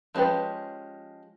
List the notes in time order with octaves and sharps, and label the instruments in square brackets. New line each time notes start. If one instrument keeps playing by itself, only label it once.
[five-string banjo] F3 G#3 C#4 G4 B4